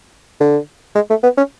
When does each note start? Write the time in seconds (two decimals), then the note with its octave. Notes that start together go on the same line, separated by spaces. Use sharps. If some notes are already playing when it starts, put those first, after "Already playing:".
0.40 D3
0.95 G#3
1.10 A3
1.23 B3
1.37 C#4